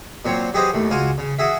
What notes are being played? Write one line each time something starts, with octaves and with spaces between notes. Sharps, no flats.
A#2 F#3 C4 C#5
F#3 G4 G#4 B4 C5 D#5
D#2 A2
C#2 F4 F#4 G#5
C#3
F#4 G#4 E5